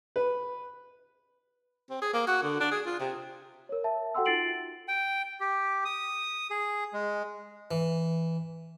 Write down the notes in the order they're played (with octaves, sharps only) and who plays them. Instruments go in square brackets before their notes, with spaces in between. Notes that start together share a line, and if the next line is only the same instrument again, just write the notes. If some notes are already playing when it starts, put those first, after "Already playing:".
[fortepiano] B4
[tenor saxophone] C4
G#4
A#3
F#4
D3
D4
G#4
F4
C3
[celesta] A#4 C#5
E5 A5
F#4 A4 F#5 G5 C6 E6
D#4 F4 A6 C7 D7 F#7
[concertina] G5
G4
D#6
G#4
G#3
[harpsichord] E3